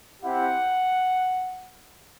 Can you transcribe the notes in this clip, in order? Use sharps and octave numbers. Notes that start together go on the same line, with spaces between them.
C4 E4 G4 F#5